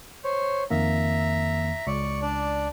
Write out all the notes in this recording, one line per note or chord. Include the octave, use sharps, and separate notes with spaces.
C5 C#5
F2 D#3 A#3 E5 A#5
C#2 D5 C#6
D4 D5